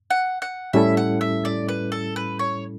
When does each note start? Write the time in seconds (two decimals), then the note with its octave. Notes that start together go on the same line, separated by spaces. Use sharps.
0.10 F#5
0.42 F#5
0.73 A2 G3 C#4 E4 A4 E5
0.97 F#5
1.21 E5
1.45 D5
1.68 B4
1.92 A4
2.16 B4
2.39 C#5